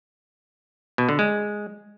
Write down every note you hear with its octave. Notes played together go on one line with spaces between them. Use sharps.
B2
D3
G#3